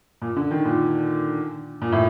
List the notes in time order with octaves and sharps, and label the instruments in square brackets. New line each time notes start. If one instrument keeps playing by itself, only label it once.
[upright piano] A#2
D3
D#3
A#2
A#2
A2